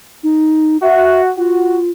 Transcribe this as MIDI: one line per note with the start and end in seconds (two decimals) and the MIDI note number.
0.23 0.77 63
0.82 1.31 66
0.82 1.21 76
1.37 1.91 65
1.37 1.78 66